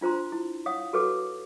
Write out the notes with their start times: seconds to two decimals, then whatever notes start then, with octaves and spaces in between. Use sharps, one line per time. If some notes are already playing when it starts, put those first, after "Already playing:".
0.01 D4 F4 C5 A#5 C6
0.32 E4
0.66 C#5 F5 F#5 D#6
0.93 F#4 A4 B4 C#5 D6